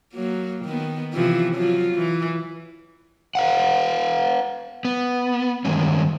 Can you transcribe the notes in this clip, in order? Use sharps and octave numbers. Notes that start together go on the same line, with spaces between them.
F#3 A#3
D#3 B3
C3 E3 F3
F3 F#3 F4
E3
B4 F5 F#5
B3
G2 D#3 G#3 C#4